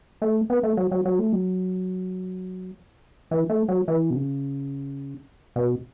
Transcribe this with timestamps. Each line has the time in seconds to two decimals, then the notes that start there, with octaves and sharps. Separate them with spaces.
0.22 A3
0.50 B3
0.63 A3
0.77 F#3
0.91 F#3
1.05 F#3
1.19 A3
1.32 F#3
3.31 E3
3.50 A3
3.68 F#3
3.88 E3
4.10 B2
4.16 C#3
5.56 B2